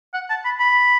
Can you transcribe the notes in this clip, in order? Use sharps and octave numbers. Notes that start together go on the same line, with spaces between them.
F#5
A5
B5
B5